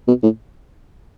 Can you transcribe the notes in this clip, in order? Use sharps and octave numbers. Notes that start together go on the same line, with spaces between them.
B2
A2